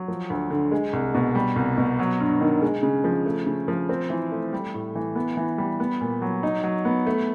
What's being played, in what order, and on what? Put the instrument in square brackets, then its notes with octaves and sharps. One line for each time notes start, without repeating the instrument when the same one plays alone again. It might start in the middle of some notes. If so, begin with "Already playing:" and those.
Already playing: [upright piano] F#3
F3
D2
D3
G#3
C2
B2
G3
C2
B2
F#3
G2
D#3
G#3
C#3
F3
A3
C#3
F3
C4
E3
A3
G3
A2
E3
B3
E3
G3
B3
A#2
F#3
D#4
F#3
B3
A3